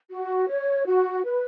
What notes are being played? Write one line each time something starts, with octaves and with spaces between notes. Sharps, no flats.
F#4
C#5
F#4
B4